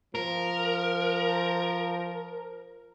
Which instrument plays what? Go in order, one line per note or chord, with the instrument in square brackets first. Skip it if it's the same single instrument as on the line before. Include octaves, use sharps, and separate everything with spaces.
[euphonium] F3 [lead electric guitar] A#4